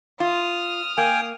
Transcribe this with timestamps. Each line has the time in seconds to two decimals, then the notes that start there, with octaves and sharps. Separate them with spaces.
0.20 F4 D#6 F6
0.98 A#3 G5 G#5